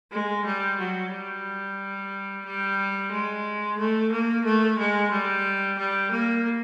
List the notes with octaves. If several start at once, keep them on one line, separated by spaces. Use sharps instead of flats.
G#3
G3
F#3
G3
G3
G#3
A3
A#3
A3
G#3
G3
G3
A#3